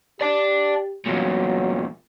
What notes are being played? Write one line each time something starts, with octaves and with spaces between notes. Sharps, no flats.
G4 D5 A5
E2 A#2 F#3